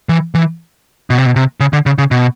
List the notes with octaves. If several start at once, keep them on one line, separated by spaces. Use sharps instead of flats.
E3
E3
B2
C3
B2
C3
C#3
D3
C#3
C#3
B2